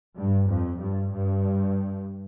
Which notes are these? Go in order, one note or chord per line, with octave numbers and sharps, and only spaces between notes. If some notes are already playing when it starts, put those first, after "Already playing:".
G2
F2
G2
G2